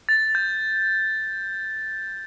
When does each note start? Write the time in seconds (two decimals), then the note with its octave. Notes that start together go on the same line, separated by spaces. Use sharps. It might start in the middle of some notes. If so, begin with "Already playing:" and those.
0.09 A6
0.35 G6